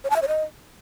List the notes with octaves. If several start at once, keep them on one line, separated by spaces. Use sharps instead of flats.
C#5
A5
E5
C#5
D#5